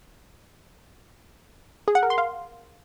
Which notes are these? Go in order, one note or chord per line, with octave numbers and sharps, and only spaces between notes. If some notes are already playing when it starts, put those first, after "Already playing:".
G#4
F#5
A#4
C6
F5